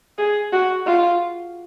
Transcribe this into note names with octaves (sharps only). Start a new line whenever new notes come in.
G#4
F#4
F4